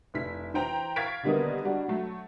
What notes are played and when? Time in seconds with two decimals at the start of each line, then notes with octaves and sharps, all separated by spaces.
0.14 F1 E4 B6
0.54 E3 C5 G5 A#5
0.96 F5 C#6 G#6 A6 B6 D7
1.23 D3 D#3 G3 A#3 B3 D#4
1.64 G3 D4 F#4
1.88 F#3 A3